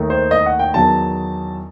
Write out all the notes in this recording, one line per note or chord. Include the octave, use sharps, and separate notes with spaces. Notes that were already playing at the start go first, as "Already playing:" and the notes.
Already playing: D#2 D#3 A3 D#4
C5
D#5
F#5
G5
E2 D#3 F#3 A5